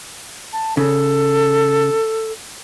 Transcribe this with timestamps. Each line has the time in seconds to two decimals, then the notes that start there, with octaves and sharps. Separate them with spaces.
0.53 A5
0.77 C#3 A4